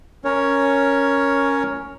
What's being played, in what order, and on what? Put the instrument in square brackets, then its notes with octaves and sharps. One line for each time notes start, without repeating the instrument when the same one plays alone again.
[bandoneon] C#4 A#4 C#5